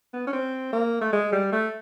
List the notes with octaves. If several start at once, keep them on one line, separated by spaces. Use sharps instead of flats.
B3
C#4
C4
A#3
A3
G#3
G3
A3